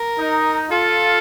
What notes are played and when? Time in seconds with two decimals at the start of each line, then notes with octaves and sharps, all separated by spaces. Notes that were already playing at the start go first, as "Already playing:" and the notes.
Already playing: A#4
0.19 D#4
0.71 F4 A4